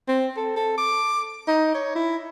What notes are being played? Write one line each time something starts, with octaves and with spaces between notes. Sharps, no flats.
C4
A4
A4
D6
D#4
C#5
E4